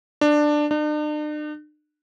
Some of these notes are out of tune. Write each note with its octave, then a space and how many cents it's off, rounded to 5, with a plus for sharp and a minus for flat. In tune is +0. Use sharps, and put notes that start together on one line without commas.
D4 +15
D4 +45